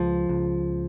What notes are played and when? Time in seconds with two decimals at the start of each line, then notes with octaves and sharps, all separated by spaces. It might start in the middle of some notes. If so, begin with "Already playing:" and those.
Already playing: C#2 F3
0.29 C#2